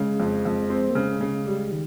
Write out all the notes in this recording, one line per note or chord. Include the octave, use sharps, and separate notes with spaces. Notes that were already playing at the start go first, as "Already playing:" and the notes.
Already playing: C#3 G#3
F2
F2
C4
A#3
C#3 G#3
C#3
G3
D#3